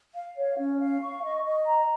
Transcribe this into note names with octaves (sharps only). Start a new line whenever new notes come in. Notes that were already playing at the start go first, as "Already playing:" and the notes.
F5
C#5
C#4
F5
C#6
D#5
D#5
A#5